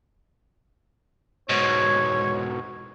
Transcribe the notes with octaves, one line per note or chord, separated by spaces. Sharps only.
G#2 B2 C#5